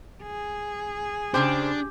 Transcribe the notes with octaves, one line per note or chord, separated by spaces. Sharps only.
G#4
C#3 D4 G4 C5